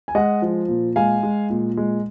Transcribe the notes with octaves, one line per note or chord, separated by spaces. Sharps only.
G#5
G#3 D#5 F#5
F3
A#2
G#3 F5 G#5
G#3
A#2
G#3